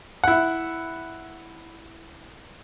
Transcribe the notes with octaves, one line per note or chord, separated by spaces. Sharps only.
E4 F#5